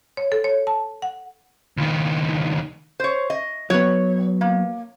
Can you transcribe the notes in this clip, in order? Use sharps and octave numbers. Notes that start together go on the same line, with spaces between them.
C#5
A4
C#5
A5
F#5
C#2 D#3
C5 C#5
D#5
F#3 B3 C#5
A#3